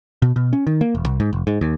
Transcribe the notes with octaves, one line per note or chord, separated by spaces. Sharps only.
B2
B2
C#4
D#3
A#3
E1
C2
G#2
F1
G#2
D#2